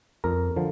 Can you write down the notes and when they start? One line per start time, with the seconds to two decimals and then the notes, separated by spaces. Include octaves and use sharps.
0.24 F2 A#4
0.56 D3 F3